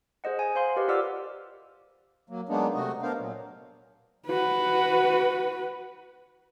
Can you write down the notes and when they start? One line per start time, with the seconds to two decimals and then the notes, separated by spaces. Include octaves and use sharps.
0.24 G#4 C5 D#5 F#5
0.39 D#5 G#5
0.55 C5 F5 C6
0.77 G4 A#4 B4 D#5
0.88 F4 D5 F#5 D6 E6 F6
2.30 F#3 A#3
2.49 F#3 G#3 A#3 B3 D4 D#4
2.75 C3 A3 F#4 D#5
3.02 B3 D4 A#4 C5 F5
3.18 A#2 F#3
4.27 F#4 B4